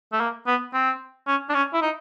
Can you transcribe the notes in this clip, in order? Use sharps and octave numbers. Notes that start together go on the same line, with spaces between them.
A3
A#3
B3
C4
C#4
D4
C#4
E4
D#4